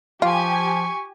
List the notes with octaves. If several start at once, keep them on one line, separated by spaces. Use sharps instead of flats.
F3 F4 G4 G#5 C#6